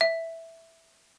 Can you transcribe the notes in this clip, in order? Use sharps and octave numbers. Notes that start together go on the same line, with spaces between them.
E5